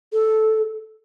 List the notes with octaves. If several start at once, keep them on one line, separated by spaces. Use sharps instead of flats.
A4